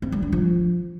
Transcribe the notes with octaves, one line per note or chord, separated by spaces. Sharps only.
C4
G3
D4
F3